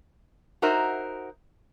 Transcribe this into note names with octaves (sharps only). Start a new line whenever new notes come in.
D#4 F#4 A#4 C5 E5